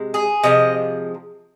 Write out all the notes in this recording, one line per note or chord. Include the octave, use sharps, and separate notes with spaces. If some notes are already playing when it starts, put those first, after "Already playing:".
Already playing: C3 G#3
G#4
C3 F3 G#3 D#5